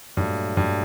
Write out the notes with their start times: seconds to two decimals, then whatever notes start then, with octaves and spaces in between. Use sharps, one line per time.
0.17 G2 A#2 F#3 A3
0.57 G2